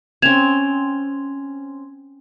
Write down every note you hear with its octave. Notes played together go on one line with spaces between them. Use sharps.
C4 C#4 G#6 E7 F7